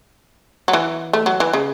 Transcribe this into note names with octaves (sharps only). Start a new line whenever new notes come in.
F#3
E3
A3
F#3
E3
C#3